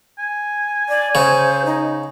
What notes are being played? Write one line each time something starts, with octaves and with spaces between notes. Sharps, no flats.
G#5
D5
C#3 C5
D#4